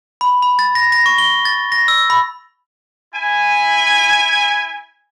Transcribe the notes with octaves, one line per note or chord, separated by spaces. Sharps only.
B5
B5
A6
A#6
A#6
C#6
G7
A6
A#6
E6
B5
E4 G#5